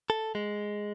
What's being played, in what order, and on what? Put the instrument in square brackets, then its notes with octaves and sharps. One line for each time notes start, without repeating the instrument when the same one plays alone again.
[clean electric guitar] A4
G#3